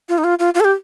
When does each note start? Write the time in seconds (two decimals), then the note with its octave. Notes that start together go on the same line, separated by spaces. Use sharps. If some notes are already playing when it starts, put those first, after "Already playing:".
0.09 F4
0.18 D#4
0.24 F4
0.39 F4
0.55 F4
0.60 A4
0.65 G4